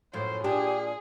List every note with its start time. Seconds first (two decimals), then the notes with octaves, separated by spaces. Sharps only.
0.13 F#2 A2 F3 C5
0.44 A#2 D4 G4 G#4